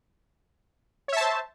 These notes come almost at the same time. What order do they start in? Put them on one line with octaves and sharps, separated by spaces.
C#5 E5 A5 C5